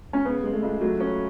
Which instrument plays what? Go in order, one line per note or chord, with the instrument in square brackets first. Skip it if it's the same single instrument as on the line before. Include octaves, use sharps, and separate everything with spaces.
[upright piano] C#4
[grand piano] C#3 [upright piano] B3
[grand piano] G#3
[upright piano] A3
[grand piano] C#2
[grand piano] F#3 [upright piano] A3
[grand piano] C#4